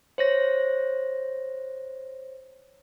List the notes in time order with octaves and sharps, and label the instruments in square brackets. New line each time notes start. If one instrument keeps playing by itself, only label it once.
[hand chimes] C5 C#5 A#6